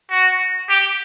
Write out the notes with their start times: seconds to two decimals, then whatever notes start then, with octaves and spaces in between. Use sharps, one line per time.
0.11 F#4
0.69 G4